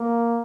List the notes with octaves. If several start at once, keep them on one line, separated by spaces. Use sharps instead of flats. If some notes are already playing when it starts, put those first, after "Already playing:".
Already playing: A#3